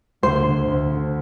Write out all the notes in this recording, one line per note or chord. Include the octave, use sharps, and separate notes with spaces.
D2 C5
D2
D2
D3